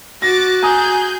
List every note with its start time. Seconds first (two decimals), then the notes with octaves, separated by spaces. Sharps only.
0.22 F#4 D6 A6 A#6
0.62 G#4 G#5 A#5 D#6 G6